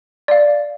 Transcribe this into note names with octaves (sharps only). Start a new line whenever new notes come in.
D5 F5